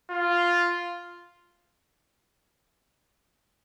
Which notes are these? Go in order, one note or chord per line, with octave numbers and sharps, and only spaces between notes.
F4